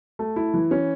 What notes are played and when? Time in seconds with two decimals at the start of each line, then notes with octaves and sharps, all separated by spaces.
0.19 A3
0.36 E4
0.54 E3
0.71 C#4